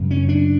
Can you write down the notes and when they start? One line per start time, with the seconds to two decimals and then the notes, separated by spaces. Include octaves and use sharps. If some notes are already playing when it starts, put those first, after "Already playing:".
Already playing: F#2 C#3
0.11 C#4
0.29 D4